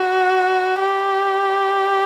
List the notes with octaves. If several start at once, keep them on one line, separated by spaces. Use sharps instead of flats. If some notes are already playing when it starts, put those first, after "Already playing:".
Already playing: F#4
G4